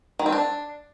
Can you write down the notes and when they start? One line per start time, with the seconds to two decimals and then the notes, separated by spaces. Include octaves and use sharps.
0.19 D#3
0.26 C4
0.32 D4